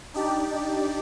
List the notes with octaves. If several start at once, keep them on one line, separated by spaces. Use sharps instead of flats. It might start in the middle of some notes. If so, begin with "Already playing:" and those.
D4 D#4 G4 D5